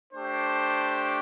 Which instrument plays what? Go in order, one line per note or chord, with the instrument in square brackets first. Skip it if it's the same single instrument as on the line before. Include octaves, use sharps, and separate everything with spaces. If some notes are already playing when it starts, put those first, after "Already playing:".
[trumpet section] A3 D4 G4 C5